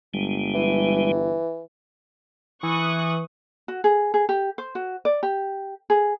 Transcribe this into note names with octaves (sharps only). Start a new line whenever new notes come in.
G1 G3 G#3
E3
E3 C#6 D#6 F#6
F#4
G#4
G#4
G4
C5
F#4
D5
G4
G#4